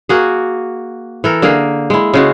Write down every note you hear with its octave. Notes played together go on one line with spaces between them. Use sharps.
A#3 F#4 G#4
E3 A4 A#4
D3 A#3 G#4
G#3 E4
C#3 G#3 F#4